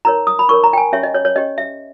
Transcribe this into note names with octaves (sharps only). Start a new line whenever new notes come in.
D#4 A#4 C#5 A#5
D#6
B5
D#4 A#4 C#5 C#6
A#5
G5
G#5
C#4 G4 C#5 E5
D#5
C#5
C#5
C#4 G4 C#5 D#5
E5